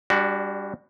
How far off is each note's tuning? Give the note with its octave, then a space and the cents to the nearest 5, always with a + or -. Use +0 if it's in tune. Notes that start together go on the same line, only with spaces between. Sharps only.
G3 +25 D4 -10 F#4 +5